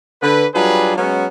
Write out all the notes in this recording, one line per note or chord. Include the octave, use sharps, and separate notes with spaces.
D3 B4
F#3 G3 D4 F4 G#4 B4
F#3 G#3 B3 C#4